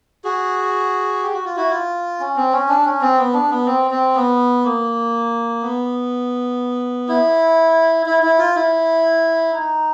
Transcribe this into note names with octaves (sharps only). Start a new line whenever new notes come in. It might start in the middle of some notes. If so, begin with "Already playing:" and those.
F#4 G#4
G4
F#4
F4
E4 F#4
F4
C#4
C4
C#4
D4
C#4
C4
B3
D4
B3
C4
C4
B3
A#3
B3
E4
E4
E4
F4
E4
D#4